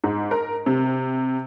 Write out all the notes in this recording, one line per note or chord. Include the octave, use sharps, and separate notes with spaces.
G#2
A#4
C3